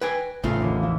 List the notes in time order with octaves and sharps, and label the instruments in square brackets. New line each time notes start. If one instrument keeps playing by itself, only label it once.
[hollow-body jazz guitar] B4 G5 G#5 [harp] G#6 A#6
[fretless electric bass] A1 [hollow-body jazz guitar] C#3 A3 F4 [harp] A4 C5
[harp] E1 D#2
E3 F3 E4